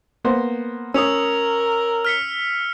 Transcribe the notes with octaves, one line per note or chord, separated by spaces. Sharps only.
A#3 B3 C5
C#4 A#4 D#6 E6 F7
F6 B6 C#7